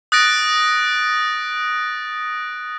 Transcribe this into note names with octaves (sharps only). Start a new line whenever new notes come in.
D#6 F#6 A6 A#6 D7